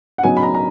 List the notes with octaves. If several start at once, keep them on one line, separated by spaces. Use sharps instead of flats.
F#5
C#3 F#3 B3 D#4 G#5
B5
A#5
A#5